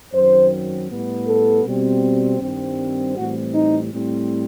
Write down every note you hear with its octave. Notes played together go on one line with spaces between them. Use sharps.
F#2 D#3 F#3 C4 C5
A2 G3 B3
A4
B2 G3 C4
G2 D#3 G3 C4
A2 E3 G3 C4 F#4
D#4
A2 G3 C4